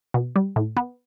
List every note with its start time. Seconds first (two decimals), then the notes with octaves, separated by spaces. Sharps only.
0.14 B2
0.36 G3
0.56 A2
0.77 B3